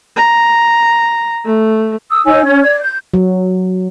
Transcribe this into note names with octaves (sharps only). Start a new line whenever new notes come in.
A#5
A3
D#6 E6
D#4 C#5 G#5 E6
C#4 G#6
D5 G#6
G6
F#3